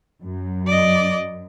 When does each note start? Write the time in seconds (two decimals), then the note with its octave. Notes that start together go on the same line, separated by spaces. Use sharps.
0.23 F#2
0.67 D5 D#5